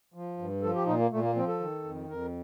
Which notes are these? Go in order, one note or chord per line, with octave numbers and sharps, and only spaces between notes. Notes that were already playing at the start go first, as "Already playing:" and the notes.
F3
G2
F3 A4
G4
A#2 D#4
A#3
A#2 A3
A#3
F3 C4
A4
D#3
F2
F2 A#4